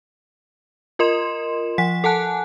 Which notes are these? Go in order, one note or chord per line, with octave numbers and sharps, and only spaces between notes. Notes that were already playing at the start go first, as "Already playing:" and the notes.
F4 A#4 D#5 C6 E7
F3 F#5 B6
A4 F#5 G#5 A5 F#6